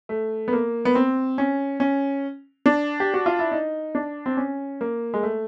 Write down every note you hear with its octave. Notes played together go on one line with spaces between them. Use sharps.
A3
B3
A#3
B3
C4
C#4
C#4
D4
G4
F#4
F4
E4
D#4
D4
C4
C#4
A#3
G#3
A3